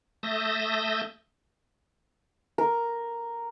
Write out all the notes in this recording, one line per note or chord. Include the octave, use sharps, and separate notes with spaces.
A3 E5 A5 D#6 G6 A#6
A#4